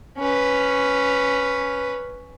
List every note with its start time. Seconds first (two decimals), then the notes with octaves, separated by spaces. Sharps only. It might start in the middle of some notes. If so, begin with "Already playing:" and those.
0.18 C#4 B4